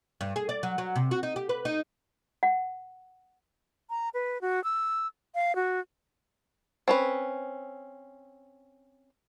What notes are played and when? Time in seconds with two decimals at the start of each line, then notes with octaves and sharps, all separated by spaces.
0.21 G2
0.36 G#4
0.49 D5
0.63 F#3
0.78 F#3
0.96 C3
1.11 F#4
1.23 D#4
1.36 G4
1.49 B4
1.65 D#4
2.43 F#5
3.90 A#5
4.14 B4
4.41 F#4
4.64 E6
5.35 F5
5.56 F#4
6.88 C4 C#4 B4